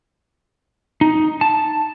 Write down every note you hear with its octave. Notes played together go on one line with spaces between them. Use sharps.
D#4
A5